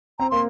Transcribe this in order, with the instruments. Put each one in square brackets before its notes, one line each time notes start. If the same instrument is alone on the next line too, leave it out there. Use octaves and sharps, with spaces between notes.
[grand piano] C4 [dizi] A#5
[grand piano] A#3 [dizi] C6